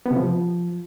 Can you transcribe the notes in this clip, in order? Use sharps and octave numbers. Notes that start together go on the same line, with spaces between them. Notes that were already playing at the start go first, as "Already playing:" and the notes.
B3
C3
F3